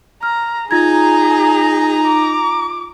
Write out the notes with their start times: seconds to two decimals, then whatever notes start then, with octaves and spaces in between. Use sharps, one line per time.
0.23 A#5 F6
0.71 D#4 F4 G#4 A#5 G#6
2.07 D6